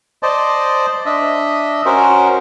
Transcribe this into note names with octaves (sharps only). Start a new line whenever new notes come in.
C5 D5 D#5 A5
D4 D#5 E5
C#4 F#4 A#4 C5